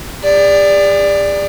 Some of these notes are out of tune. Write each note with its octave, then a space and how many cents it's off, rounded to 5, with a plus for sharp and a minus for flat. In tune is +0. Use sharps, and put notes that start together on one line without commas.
G#4 -45 D5 +0